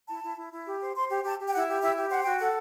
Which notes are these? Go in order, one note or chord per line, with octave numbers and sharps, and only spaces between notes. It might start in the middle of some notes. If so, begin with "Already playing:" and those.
E4 A5
E4
E4
E4
G4
C5
C5 C6
G4
G4 A5
G4
G5
E4 F#5
G4
E4 E5
G4
C5 F#5
F#4 G5
A4 F#5